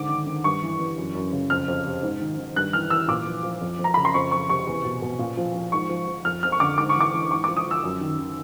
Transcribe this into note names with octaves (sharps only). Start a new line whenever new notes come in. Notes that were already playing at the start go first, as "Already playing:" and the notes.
Already playing: G#2 D3 D6
D#3
D#3
G2 C#6
E3
E3
F#2
F#2
C#3
F2 F6
F2
C3
G#2
D#3
D#3
G2 F#6
E3 F6
E3 E6
A#2 D6
F3
F3
F2
F2
A#5
C#3 B5
C6
F2 C#6
F2 C#6
C3 C#6
E2
B2
B2
A#2
F3
F3
G#2 C#6
F3
F3
F2 F6
F2 F6
C#6
D3 D6
G#2 D6
C#6
E3 D6
E3
G#2 C#6
D6
F3
D#6
F3 E6
F#2
D#3
D#3